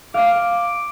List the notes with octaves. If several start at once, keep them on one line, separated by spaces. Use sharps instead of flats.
F5 D6